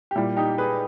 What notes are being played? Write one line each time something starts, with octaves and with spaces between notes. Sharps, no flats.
G4
A#2 G3 E4
D#4 G4
G#4 B4